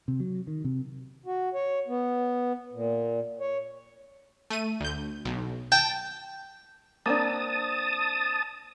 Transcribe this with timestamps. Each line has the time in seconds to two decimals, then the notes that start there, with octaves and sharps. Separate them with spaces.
0.08 C3
0.20 F#3
0.47 D#3
0.64 C3
1.26 F#4
1.54 C#5
1.88 B3
2.73 A#2
3.40 C#5
4.50 A3 D#7
4.80 D2 G6
5.25 B1
5.72 G5 A5
7.06 A#3 C4 D4 A5 D#6